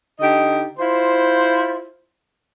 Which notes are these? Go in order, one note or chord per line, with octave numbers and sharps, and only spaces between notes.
D3 D#4 G4 D#5
E4 F4 C5